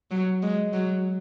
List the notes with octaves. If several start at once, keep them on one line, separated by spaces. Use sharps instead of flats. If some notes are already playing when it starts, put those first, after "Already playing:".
F#3
G#3
F#3